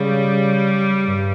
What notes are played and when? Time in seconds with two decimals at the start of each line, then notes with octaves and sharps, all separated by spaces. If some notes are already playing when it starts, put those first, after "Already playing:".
Already playing: C#3 G3
1.03 G2